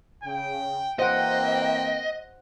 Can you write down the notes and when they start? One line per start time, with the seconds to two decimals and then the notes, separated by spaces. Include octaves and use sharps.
0.24 C#3 G5
0.99 E3 A#3 C4 C5 D#5 F#5 G5